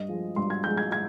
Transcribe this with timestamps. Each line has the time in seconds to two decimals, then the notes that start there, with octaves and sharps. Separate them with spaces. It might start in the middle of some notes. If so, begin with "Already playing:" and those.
Already playing: G2 D#5
0.09 F3 G#3
0.36 G2 C6
0.50 G#6
0.64 F3 G#3 G6
0.77 G#6
0.92 G#6